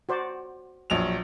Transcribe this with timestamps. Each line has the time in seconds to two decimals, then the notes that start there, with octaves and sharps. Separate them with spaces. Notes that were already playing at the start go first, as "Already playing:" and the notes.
0.09 F#4 C5 D5
0.90 A#1 F#3 F7